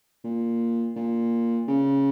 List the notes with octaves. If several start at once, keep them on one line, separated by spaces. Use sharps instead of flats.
A#2
A#2
C#3